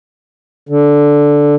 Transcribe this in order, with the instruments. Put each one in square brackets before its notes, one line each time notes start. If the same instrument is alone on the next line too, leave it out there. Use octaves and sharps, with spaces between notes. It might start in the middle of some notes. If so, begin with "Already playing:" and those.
[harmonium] D3